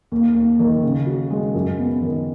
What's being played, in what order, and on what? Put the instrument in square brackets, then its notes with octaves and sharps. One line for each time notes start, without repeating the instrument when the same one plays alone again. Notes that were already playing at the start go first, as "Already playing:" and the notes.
[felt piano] D#2
D#2
D#3
C#3
F#4
G#3
F#2
B3
D#3